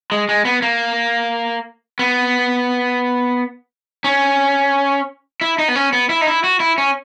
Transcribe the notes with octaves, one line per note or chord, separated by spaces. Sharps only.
G#3
G#3
B3
A#3
B3
C#4
E4
D#4
B3
C#4
B3
E4
D#4
E4
F#4
E4
C#4